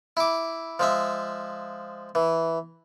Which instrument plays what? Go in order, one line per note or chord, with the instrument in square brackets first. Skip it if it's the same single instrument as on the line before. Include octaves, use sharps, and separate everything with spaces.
[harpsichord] E4 D6
F3 G#3 E5
E3